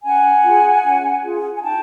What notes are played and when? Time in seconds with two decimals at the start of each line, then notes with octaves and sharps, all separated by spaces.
0.04 C#4 F#5 G#5
0.43 F4 G#4
0.83 C#4
1.23 F4 G#4
1.56 G#5
1.62 D#4 G5 A5